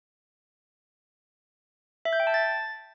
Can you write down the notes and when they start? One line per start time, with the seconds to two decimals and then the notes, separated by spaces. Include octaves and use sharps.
2.05 E5
2.13 G6
2.20 G5
2.27 A5
2.34 A6